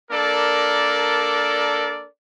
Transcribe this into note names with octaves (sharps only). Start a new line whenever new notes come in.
A#3 D4 A4 A#4 D5